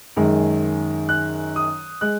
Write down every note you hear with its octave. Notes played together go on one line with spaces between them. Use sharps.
F#2 D#3 G#3
F#6
D#6
G#3 F#6